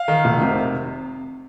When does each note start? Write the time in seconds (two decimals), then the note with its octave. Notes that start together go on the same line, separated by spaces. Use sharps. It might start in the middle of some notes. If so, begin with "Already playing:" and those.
Already playing: F5
0.08 D#3
0.25 F1
0.42 C3